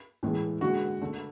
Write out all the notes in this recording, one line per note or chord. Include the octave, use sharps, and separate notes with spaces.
A2 E3 G#3
D3 G#3 F#4
D3 A3